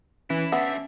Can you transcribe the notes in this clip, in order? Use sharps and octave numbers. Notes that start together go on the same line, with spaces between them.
E3 C#4 E4
D3 A3 B3 E5